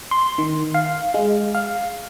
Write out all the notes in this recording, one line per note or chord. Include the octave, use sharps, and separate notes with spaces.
C6
D#3
F5
G#3
F5